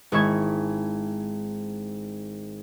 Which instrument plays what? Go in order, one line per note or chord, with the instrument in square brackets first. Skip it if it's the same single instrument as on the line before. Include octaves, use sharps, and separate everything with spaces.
[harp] G#1 G#3 E4 C#6 G#6